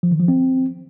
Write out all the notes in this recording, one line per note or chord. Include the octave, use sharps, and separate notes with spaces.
F3
D#3
F3
C4